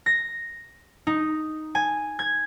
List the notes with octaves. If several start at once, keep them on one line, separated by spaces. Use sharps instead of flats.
A#6
D#4
G#5
G#6